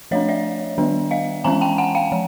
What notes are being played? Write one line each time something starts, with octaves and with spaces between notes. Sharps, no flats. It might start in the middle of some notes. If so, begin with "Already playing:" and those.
F3 A3 D4 C#5 D#5
D5 E5
D#3 G3 B3 D4
D#5 F5
E3 G#3 C#4 G#5 A#5
G5 A5
F#5 G#5
F5 G5
F3